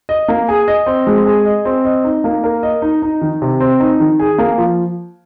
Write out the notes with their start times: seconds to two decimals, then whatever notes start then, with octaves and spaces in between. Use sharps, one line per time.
0.09 D#5
0.28 A#3
0.49 G#4
0.68 D#5
0.86 C4
1.07 G#3
1.26 G#4
1.45 D#5
1.65 C4
1.85 D#5
2.04 D#4
2.24 A#3
2.44 A#4
2.63 D#5
2.82 D#4
3.02 D#4
3.21 D#3
3.42 C3
3.60 C4
3.80 D#4
4.00 D#3
4.20 G#4
4.38 A#3
4.58 F3